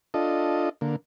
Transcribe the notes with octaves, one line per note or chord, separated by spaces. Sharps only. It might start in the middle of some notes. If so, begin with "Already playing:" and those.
D4 F4 A4 D#5
D3 A#3